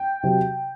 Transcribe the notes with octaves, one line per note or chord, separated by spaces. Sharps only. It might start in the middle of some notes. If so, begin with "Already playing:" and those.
Already playing: G5
C3 F#3